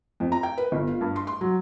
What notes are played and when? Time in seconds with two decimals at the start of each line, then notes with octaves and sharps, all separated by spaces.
0.20 F2
0.32 A#5
0.43 G5
0.58 B4
0.72 G1
0.88 F4
1.01 G2
1.16 C6
1.27 C6
1.41 F#3